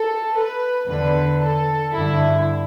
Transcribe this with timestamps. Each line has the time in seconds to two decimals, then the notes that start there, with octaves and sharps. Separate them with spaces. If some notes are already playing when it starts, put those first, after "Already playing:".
Already playing: A4
0.35 B4
0.88 E2 D3 B4
1.41 A4
1.94 G2 D3 E4